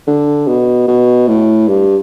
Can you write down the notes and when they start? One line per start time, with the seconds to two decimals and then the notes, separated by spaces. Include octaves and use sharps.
0.07 D3
0.48 B2
0.87 B2
1.28 A2
1.68 G2